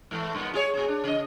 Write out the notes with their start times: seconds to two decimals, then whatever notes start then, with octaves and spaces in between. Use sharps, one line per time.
0.11 G#2 E3 A3
0.35 G2 A#2 B3
0.54 F4 G#4 C#5
0.74 A#2 G#4
0.88 D4
1.04 C#3 D#5